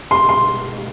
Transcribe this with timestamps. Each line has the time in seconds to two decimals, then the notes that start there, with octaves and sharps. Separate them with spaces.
0.11 C6
0.29 C6